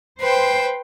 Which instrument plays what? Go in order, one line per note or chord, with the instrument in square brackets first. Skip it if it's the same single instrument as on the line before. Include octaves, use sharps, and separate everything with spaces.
[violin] B4 G5 [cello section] C5